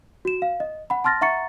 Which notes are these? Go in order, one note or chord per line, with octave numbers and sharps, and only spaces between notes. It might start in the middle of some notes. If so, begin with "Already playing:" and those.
F#4 E7
F5
D#5
F#5 B5
A5 C6 F6 A6 A#6
E5 F#5 A#5 C#6 A6 C#7